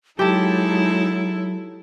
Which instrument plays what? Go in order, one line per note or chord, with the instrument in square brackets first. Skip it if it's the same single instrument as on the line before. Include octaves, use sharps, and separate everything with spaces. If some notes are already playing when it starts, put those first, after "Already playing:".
[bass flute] F#3 [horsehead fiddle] G#3 D#4 [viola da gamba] E4 A4 [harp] G4 A5